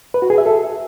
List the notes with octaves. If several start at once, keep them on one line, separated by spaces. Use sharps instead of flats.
B4
F#4
G#4
E5
A4